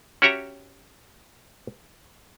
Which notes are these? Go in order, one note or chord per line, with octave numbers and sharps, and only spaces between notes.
C#4 F#4 G4 C#5 E5 A#5